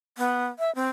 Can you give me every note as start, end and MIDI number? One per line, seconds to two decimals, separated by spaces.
0.18 0.46 59
0.59 0.73 76
0.75 0.89 60